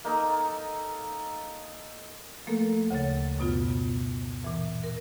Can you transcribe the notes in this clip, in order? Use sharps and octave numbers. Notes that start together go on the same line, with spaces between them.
A#3 D#4 A4
F3 A3 A#3 A4 A#4
D2 C#3 C#5 A6
F#2 B2 B3 F4
A#2 E3
A#4